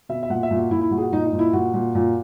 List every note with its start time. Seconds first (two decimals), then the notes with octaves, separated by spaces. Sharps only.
0.09 B2 E5
0.23 E5
0.30 A#2 F#5
0.43 E5
0.51 A#2
0.58 F#4
0.71 A#2 E4
0.81 E4
0.91 A#2 F#4
0.98 G#4
1.02 F#4
1.12 A#2 D#4
1.25 D#4
1.33 A#2
1.39 E4
1.53 A#2 F#4
1.74 A#2
1.95 A#2